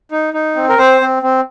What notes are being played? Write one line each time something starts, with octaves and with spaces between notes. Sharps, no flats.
D#4
D#4
C4
A#4
C4 C5
C4
C4